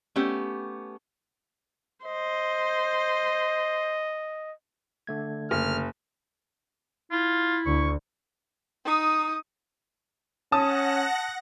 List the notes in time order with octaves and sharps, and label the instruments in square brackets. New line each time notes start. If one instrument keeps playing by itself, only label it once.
[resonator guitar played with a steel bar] A3 B3 C#4 G4
[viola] C5 [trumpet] D#5
[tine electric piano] D3 A3 G#6
[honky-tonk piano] F#1 [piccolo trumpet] F6
[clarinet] E4 [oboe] F4
[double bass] D2 [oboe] C#6
[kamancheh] D#4 D#6
[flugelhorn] C#4 [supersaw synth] F#5 A#6 [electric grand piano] A5 [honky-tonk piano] D#6